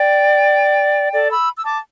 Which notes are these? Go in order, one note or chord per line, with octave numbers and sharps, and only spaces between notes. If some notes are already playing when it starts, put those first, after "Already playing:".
Already playing: D5 G5
A4 D5
B5 E6
E6
A5 D6